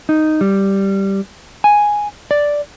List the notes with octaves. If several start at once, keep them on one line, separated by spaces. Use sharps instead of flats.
D#4
G3
G#5
D5